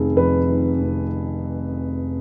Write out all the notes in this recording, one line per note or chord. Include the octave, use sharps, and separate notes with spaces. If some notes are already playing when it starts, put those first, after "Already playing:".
Already playing: F1 D#3 G#4
F2 B4
D#3
F1